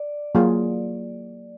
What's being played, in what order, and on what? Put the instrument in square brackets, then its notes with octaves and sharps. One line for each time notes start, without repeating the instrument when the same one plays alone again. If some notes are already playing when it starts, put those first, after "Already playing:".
Already playing: [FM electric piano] D5
[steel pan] F#3 A#3 F4 G#4